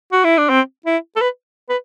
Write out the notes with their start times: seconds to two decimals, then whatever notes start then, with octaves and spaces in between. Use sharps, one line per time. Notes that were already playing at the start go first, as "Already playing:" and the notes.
0.12 F#4
0.24 E4
0.38 D4
0.49 C4
0.86 E4
1.16 A4
1.21 B4
1.69 B4